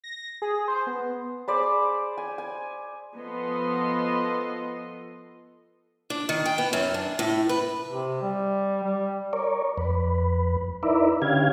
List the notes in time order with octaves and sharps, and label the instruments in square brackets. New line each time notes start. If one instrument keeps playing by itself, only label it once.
[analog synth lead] A#6
G#4
C5
B3
[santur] G#4 C5 D5 B5
G#5
G#5
[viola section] F3 B3 A4 D#5 C6
[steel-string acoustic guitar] D4
D#3
G5
B3
F#2
D4
A2
B4
[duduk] C3
G3
G3
[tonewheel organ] A#4 C#5 D5
F2 B4
D#4 E4 A#4 B4 D5 E5
D3 C#4 G4 F5 G#6